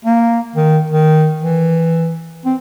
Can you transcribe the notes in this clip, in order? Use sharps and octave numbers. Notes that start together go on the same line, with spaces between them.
A#3
D#3
D#3
E3
C4